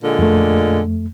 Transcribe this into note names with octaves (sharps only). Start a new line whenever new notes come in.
A#2 D3 G#3
F2 A3